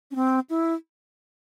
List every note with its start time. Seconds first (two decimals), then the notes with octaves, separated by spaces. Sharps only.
0.11 C#4
0.15 C4
0.50 E4